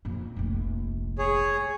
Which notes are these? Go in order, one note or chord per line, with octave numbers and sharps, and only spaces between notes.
F2 A#2
F1 A#1
G#4 C#5